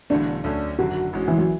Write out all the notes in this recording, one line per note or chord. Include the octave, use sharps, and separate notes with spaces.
E1 E2 D3 F#3 A3 D4
D2 D3 F#3 A3 C#4
G#1 F#2 D3 F#4
A1 G#2 G#3 C#4
E3
F#3